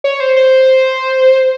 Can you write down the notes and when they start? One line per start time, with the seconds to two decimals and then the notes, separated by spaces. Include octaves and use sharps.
0.04 C#5
0.20 C5
0.36 C5